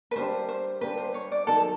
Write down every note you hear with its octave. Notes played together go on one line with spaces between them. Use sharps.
B4
G3 A#3 D4 G4 C5
C5
G3 A#3 D4 G4 B4
C5
C#5
D5
D#3 F#3 B3 A4
A4